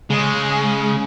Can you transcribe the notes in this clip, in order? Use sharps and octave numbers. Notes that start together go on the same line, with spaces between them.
C#3 G#3